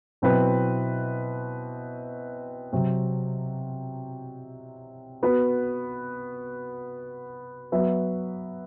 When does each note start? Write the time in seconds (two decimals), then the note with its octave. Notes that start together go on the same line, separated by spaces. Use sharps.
0.22 B2 F#3 C4 E4 B4
2.72 C3 F#3 C4
5.23 B3 F#4 B4
7.72 F#3 B3 F#4 B4 E5